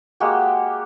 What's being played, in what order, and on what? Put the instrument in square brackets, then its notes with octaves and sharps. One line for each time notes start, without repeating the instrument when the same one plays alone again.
[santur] G#3 A#3 F#4 G4